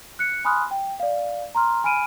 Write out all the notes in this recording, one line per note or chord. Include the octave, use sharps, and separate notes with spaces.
F#6 C#7
G#5 B5 C6 D#6 F6 F#6
G5
D5 F5
A#5 C6 F6
G#5 B5 F6 D7 D#7